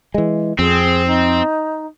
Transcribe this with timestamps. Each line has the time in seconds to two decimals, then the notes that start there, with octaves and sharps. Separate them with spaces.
0.14 E3 G#3
0.59 F2 C4 G#4
1.06 D#4